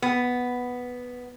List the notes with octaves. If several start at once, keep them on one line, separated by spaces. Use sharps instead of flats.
B3